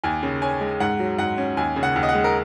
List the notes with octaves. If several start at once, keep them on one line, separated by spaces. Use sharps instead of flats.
D#2 G#5
C#3
C#4 G#5
G#3
G#2 F#5
F#3
G#2 F#5
C#4
D#2 G#5
C#3
F#5
D#2
D#5
F#5
G#3
A#4